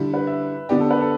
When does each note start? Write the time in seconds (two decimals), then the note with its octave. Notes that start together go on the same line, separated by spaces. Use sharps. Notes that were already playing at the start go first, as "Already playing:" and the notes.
Already playing: D3 G3 E4
0.14 B4
0.27 E5
0.69 D3 B3 G4 D5
0.80 A4
0.91 B4
1.01 A4